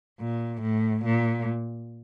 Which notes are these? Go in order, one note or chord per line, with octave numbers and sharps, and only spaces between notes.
A#2
A2
A#2